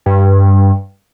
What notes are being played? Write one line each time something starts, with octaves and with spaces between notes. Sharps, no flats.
G2